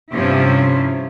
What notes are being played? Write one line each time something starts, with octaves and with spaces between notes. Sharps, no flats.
G2 C3 F3 C#4 E4